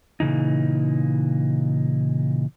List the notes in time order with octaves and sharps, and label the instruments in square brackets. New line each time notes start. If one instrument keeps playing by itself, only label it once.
[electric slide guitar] A#2 C#3 E3 D#4